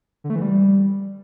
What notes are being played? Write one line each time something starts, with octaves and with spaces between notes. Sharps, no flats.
D3
A3
E3
G3